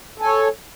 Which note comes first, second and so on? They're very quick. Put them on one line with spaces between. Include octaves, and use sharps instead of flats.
A4 G#5 C#5